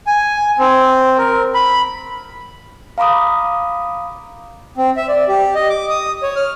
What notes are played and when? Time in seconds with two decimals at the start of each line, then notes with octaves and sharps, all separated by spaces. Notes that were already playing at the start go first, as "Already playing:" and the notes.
0.07 G#5
0.59 C4
1.18 A#4
1.54 B5
2.98 F5 A#5 B5 D6 D#6
4.77 C4
4.97 E5
5.08 D5
5.28 G4
5.55 D#5
5.69 D6
5.90 D#6
6.23 C#5
6.36 F6